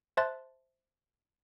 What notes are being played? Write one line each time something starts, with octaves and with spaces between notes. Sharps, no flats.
C5 E5 A5 C6 F#6 A6